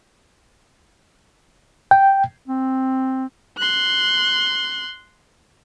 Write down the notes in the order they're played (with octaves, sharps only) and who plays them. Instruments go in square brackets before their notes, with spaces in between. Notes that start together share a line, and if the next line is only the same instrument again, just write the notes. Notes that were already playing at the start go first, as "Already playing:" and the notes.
[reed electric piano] G5
[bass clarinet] C4
[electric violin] C6 F#6